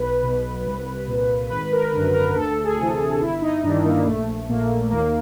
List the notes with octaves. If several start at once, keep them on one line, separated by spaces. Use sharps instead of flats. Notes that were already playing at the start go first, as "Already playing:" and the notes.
Already playing: B1 B4
B2
C2
A#2
G#1 B4
A#4
F#2 D3 A#4
A#4
D2 A4
G#4
C3 E3
G1 E4
D#4
G2 D#3 D4
A#3
A#1 A3
A#2 A#3
D#2 A#3